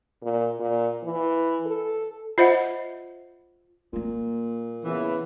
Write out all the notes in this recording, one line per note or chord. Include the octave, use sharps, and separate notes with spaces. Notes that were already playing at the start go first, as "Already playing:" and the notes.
A#2
A#2
E3
A4
F4 C5 D#5 E5 F#5
A#2 G3 A#3
C#3 E3 B3 E4